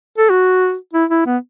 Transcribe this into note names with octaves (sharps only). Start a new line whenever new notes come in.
A4
F#4
E4
E4
B3